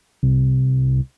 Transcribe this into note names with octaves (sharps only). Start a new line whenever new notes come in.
C2